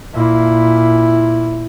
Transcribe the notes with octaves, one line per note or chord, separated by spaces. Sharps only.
A#2 E4